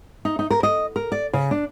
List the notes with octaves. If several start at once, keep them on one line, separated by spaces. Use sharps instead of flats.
D#4
D#4
A#4
D#5
A#4
D5
C#3
D4